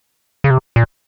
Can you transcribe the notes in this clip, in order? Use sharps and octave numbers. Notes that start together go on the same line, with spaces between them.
C#3
C3
A#2